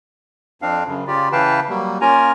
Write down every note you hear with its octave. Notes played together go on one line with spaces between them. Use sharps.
F2 C4 D4 F5
F#2 C#3
C#3 F4 G4 D5
C#3 E3 B4 F5 G5 A5
F#3 G3 A#3
A#3 C#4 F4 A#4 G#5 A#5